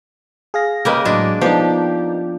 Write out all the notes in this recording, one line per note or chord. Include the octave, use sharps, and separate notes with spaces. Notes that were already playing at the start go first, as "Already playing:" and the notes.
G#4 F5 A#6
C#3 A#3 G4 A#4 B4 D#5
A2 F#3 G#3 D4
F3 B3 D4 D#4 G4